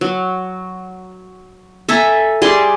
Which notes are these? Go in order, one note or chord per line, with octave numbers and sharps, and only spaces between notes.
F#3
A4 E5 G#5 A#5
G3 G#4 C6